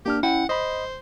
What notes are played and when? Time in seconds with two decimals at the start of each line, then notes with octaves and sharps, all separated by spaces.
0.06 A#3 D4 G4 F6
0.23 C#4 E4 F#5 G5
0.49 C5 D#5 B5